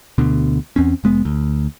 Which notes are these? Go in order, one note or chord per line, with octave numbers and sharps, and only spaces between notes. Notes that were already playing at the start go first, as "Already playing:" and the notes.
D2 B2 D3
E2 C4 C#4
F1 G#3 B3
D2